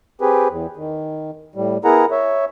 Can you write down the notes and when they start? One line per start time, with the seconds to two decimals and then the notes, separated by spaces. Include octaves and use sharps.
0.21 C4 G4 G#4 B4
0.50 E2
0.76 D#3
1.55 A2 G3
1.85 B3 E4 G#4 A#4 F#5 A#5
2.11 C#5 E5